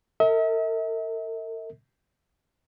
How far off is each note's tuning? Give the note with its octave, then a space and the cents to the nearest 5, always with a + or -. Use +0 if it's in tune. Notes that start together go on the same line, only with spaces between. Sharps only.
A#4 -45 E5 -45